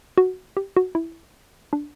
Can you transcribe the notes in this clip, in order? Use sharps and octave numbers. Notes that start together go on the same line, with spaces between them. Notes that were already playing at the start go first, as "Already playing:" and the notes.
F#4
G4
F#4
E4
D4